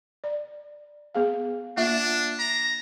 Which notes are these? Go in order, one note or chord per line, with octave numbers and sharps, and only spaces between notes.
D5
B3 G#4 F5
A#3 D4 F4 E5
A#5